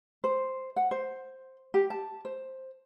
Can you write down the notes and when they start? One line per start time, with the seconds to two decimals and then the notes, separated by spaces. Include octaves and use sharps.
0.24 C5
0.76 F#5
0.91 C5
1.74 G4
1.90 A5
2.25 C5